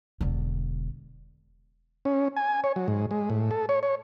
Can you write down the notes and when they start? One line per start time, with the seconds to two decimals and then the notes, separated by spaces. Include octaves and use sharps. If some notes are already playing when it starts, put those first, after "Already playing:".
0.21 E1 D3
2.05 C#4
2.37 G#5
2.64 C#5
2.76 F#3
2.88 G#2
3.11 G#3
3.30 A2
3.51 A4
3.69 C#5
3.83 C#5